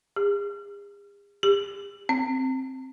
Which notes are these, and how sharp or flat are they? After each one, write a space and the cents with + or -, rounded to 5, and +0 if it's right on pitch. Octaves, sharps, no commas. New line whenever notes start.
G#4 -45
G4 +35
C4 +5